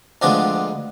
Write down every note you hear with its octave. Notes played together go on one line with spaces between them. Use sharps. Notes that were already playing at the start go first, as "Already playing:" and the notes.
D2 D3 F3 G#3 B3 C4 D4